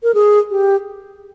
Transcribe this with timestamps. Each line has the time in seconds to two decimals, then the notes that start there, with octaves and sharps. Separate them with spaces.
0.03 A#4
0.14 G#4
0.51 G4